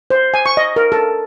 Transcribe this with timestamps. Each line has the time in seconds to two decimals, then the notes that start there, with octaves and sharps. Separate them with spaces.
0.10 C5
0.34 G#5
0.46 C#6
0.57 D#5
0.76 A#4
0.92 A4